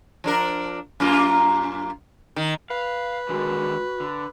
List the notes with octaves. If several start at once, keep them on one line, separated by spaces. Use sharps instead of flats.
F3 D4 A#4
F#2 A#3 F4
D#3
B4 F5
D3 D#3 G#3 F#4
D3